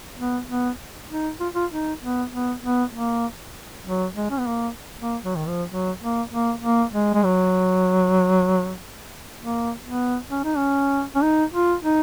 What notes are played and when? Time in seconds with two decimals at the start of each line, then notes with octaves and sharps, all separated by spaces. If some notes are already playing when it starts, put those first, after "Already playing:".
0.18 B3
0.48 B3
1.09 D#4
1.40 F4
1.55 F4
1.71 D#4
2.02 B3
2.32 B3
2.62 B3
2.94 A#3
3.85 F#3
4.16 G#3
4.30 C#4
4.39 B3
4.47 A#3
5.01 A#3
5.24 F#3
5.36 D#3
5.48 F3
5.70 F#3
6.01 A#3
6.31 A#3
6.62 A#3
6.93 G#3
7.14 G#3
7.24 F#3
9.39 A#3
9.85 B3
10.30 C#4
10.44 D#4
10.57 C#4
11.15 C#4
11.23 D#4
11.54 F4
11.84 D#4